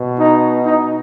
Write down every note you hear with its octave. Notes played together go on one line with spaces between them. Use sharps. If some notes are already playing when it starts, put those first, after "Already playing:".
Already playing: B2
D#4
D#4